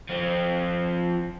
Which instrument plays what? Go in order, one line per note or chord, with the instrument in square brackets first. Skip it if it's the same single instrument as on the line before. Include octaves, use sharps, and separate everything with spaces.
[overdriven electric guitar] F3 C4